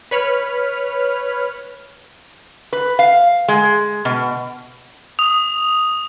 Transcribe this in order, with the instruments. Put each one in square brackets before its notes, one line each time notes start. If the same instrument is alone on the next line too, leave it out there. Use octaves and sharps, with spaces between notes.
[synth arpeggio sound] B4 C#5 B5 F6
[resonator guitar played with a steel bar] B4
F5
G#3
B2
[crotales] D#6 F7